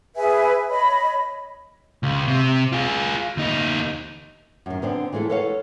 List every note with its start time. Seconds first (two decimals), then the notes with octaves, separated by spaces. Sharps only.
0.16 G#4 B4 E5 G#5
0.70 C#5 D#5 B5
2.03 C#2
2.28 C3
2.72 F4 G#4
3.37 D2 D#4
4.66 F#2 D#3
4.82 D3 B3 C4 D4
5.13 E3 G#3 A3 F4 A4
5.30 A4 B4 C#5 D#5 F5 F#5